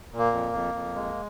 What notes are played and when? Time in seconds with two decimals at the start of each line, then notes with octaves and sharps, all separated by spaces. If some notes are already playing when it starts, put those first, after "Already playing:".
0.12 A#2
0.18 A#3
0.33 F2
0.53 F2
0.75 F2
0.95 G#3